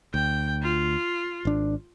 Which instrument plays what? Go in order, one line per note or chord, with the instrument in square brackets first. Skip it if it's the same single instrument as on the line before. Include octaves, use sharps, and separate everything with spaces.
[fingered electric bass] D2 [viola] G5
[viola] F4
[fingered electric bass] G#1 D4